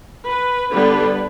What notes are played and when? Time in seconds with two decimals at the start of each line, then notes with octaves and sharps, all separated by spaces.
0.26 B4
0.71 D3 G3 B3 D4 B4